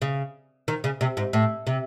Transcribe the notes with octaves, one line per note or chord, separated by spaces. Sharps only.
C#3
D#3
C#3
C3
G#2
A2
C3